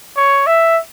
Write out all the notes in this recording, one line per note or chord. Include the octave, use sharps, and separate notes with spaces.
C#5
E5